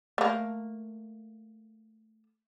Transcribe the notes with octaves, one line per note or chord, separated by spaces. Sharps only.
A3 A#3